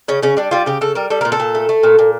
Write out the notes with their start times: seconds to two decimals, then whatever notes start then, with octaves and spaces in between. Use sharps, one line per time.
0.08 C#3 C#4
0.23 C#3 C#4
0.37 G3 D4
0.51 G3 F4
0.66 C#3 G4
0.81 C#3 A4
0.95 G3 A#4
1.10 G3 A4
1.21 A#2 A#4
1.32 A4
1.40 A#2
1.55 A3
1.69 A3
1.83 A#2
1.99 A#2